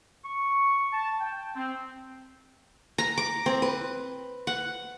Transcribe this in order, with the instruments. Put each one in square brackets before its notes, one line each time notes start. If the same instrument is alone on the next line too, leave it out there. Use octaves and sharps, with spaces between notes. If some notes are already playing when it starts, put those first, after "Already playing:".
[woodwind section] C#6
A5
G5
C4
[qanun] A#5
D6
C4
B4
F#5